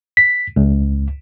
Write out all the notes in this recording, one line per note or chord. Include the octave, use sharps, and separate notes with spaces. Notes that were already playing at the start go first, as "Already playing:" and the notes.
B6
C#2